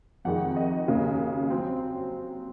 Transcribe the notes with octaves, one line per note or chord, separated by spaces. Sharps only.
F2 C3 D#3 G#3 F#5
D#5
D#2 C#3 F#3 A#3
F#3 C4